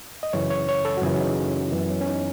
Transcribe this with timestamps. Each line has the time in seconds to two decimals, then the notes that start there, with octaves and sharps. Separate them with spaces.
0.23 D#5
0.33 F#2 C#3 E3 C#5
0.50 C#5
0.69 C#5
0.85 A4
0.97 F#4
1.02 F#2 C#3 E3 G#4
1.20 D#4
1.54 C#4
1.72 F#2 E3 B3
1.90 C#4
2.01 C#4
2.07 D#4